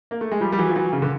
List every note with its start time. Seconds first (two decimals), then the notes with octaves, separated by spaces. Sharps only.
0.11 A#3
0.21 A3
0.31 G#3
0.40 F3 G3
0.52 G3
0.58 E3 F#3
0.69 F3
0.76 E3 F#3
0.92 C#3
1.02 D3